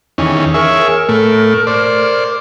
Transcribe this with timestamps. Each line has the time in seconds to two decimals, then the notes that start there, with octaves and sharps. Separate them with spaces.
0.18 E2 D#3 C#4
0.54 G#4 A#4 C#5 E5
1.09 A2 A3
1.67 C5 D5